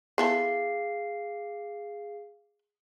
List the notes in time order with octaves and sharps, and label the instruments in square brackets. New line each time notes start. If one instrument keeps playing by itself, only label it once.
[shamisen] B3 E4 A4 [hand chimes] G#4 F5 C7